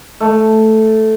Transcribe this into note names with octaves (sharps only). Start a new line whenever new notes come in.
A3